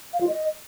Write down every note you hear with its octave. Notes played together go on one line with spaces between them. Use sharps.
F5
F4
D#5